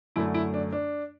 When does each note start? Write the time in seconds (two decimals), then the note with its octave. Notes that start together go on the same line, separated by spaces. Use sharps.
0.16 F#2 D3 A3 E4
0.34 E4
0.54 D4
0.72 D4